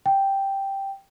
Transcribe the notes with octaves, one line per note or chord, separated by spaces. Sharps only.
G5